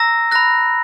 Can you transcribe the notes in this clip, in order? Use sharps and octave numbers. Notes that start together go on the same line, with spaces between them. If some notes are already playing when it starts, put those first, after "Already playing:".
Already playing: A#5 E6 A#6
B5 F#6 A#6